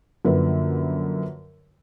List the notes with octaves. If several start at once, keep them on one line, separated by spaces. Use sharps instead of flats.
F#2 D3 F3 A#3 B4